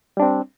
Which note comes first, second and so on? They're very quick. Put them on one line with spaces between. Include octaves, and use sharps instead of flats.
G3 D4 C4